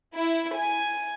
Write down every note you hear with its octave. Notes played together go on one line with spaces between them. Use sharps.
E4
G#5